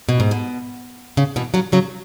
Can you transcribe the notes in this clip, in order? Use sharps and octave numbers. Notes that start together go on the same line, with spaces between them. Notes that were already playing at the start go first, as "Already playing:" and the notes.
B2
G#2
B2
C#3
B2 E3
C#3 F#3
C#3 F#3